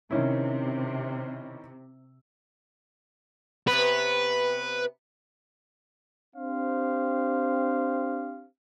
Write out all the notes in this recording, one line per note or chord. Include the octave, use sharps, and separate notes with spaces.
C3 D#3 C#4 E4
C3 B3 B4
C4 D4 G4 C5 F5